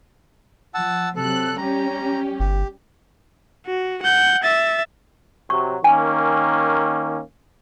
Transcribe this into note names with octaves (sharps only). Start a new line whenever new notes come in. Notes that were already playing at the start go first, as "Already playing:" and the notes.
F3 F#5 A5 E6
C3 F#3 A4 F#6
G3 C#4 G4 A#5
G1 G4
F#4
F#5 G6
E5 A6
C3 F#3 C#6
D#3 A#3 C#4 G#5